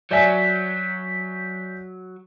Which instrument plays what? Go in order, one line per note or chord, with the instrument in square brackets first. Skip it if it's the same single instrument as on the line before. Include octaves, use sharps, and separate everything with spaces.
[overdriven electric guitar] F#3 [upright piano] D5 E5 G#5 [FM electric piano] G6 B6